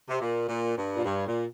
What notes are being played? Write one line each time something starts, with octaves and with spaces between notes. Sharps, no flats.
C3
A#2
A#2
G2
A#2
G2
A#2